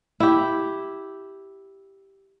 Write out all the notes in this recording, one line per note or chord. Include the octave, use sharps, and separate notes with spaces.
E4 G4